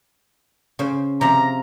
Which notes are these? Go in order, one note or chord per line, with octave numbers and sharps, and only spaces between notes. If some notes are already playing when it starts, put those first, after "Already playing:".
C#3 C5
C3 F3 A#5